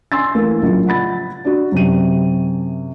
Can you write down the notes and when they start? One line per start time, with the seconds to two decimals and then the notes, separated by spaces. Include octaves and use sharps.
0.12 G#5 C6 E6 A6
0.35 E3 A3 A#3
0.62 A#1 C#3 F#3
0.86 F3 F#5 B5 A6
1.45 D4 F#4
1.72 F#2 C3 D#7